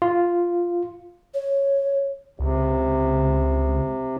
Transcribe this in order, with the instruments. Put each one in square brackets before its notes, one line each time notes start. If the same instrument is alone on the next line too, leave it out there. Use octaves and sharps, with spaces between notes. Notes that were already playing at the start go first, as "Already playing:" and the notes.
[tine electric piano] F4
[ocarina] C#5
[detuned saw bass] C#2 [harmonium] C3